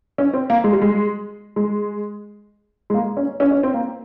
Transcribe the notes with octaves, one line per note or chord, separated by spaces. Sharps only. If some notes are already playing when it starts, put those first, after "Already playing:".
C#4
C4
A#3
G#3
G3
G#3
G#3
G#3
A#3
C#4
C#4
C#4
C4
A#3